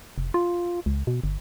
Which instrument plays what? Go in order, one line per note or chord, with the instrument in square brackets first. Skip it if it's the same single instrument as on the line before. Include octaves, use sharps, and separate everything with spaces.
[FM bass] F1
F4
C#2
B2
G1